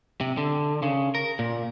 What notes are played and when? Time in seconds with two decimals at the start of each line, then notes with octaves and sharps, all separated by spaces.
0.21 C3
0.37 D3
0.82 C#3
1.15 A#4
1.39 A#2